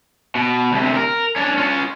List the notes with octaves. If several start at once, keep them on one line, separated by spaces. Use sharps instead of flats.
B2
D2 C3
A#4
C#4 D4
C#4 F4